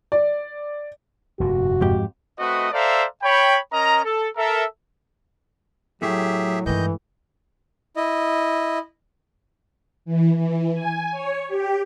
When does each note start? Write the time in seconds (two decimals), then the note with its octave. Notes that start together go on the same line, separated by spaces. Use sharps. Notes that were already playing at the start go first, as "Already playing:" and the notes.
0.12 D5
1.40 F1 G2 A#2 F#4
1.81 F2 G#2 G4
2.38 A3 C4 F#4 B4 D#5
2.72 A4 C5 D5 E5 F5 A#5
3.23 C#5 G5 B5
3.72 C#4 A#4 D#5 A#5
4.04 A4
4.36 A4 A#4 E5
6.02 A2 F#3 A3 G4 G#4 E5
6.66 G2 D#3 E3 G#3 D#5 G6
7.96 E4 D#5
10.05 E3
10.36 E3
10.73 G#5
11.11 C#5
11.48 G4